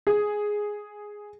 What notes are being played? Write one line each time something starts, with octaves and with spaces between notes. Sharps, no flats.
G#4